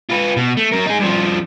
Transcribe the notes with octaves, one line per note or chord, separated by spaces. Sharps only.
F4 B4
B2
A3
F#3 A#4
D#4 G#4
G2 F3